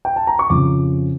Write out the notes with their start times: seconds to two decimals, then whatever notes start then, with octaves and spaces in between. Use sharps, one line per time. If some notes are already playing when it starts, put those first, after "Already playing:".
0.05 G5
0.16 A5
0.27 A#5
0.39 C#6
0.50 F2 C#3 F3 D6